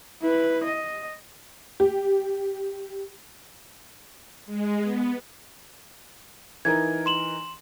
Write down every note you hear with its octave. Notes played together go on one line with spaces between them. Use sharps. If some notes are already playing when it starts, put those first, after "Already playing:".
E4 B4
D#5
G4
G#3
B3
E3 D#4 A#4 G#6
C6 E7 F#7